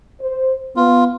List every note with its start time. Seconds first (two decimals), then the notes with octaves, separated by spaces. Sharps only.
0.20 C5
0.76 B3 F4